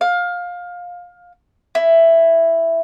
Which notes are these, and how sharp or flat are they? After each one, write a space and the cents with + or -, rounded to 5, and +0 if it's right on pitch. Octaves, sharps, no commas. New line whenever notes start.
F5 +20
E4 +5